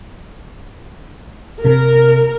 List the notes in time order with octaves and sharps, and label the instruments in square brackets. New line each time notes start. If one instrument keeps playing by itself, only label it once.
[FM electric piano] C3 [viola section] A#4